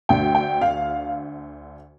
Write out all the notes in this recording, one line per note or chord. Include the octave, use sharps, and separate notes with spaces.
D2 D3 A3 G5
G5
F5